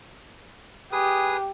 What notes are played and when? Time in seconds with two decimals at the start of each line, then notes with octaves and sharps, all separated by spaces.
0.92 G4 G#4 B4 D#6